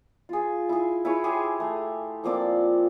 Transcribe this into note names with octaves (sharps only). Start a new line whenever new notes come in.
F4 G#4
E4 G#4
E4 G#4 B4 C#5
G4 G#4 C6
A3
F3 A#3 C4 D5